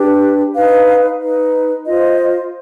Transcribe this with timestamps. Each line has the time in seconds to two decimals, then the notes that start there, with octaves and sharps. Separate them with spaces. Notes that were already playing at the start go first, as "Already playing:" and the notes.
Already playing: D4 G4 B4
0.55 D#4 B4 F5
1.21 D#4 B4
1.86 F4 C5 D#5